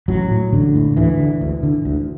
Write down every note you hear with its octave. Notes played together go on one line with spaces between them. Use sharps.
A1 F#3
A2
A1 D3
A2
D2 E3
D3
D2
D3
D2